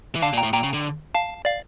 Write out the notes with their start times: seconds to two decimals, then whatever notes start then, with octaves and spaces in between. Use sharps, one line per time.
0.15 E3
0.22 D3 F5 A5
0.33 A#2
0.38 G5 A#5
0.43 A2
0.53 A#2 G5 A#5
0.64 C#3
0.74 D3
1.15 F5 A5
1.45 D5 F5